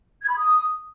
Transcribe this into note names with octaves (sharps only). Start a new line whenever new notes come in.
G#6
B5
D#6